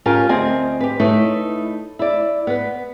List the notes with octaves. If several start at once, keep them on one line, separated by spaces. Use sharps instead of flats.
C#4 F4 G4 A#4 G#5
D2 C4 D#5 G#5
G4 B4
A3 D#4 E4 B4 C#5
E4 D5
B3 B4